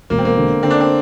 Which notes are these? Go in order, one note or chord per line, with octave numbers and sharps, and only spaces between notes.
E1 A#3
C4
A#3
D3
D3 C4
D4
C4